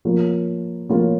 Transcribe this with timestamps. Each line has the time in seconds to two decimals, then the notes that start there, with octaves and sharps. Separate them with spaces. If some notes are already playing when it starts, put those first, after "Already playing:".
0.05 F3 A#3 F4 A#4 C#5
0.89 F3 A#3 F4 A#4 C#5